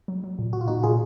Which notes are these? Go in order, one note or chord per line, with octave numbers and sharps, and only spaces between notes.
F#3
F#3
A#2
A#2 F#4
F4
A#2 D#4 F#4
A#2 F4 G#4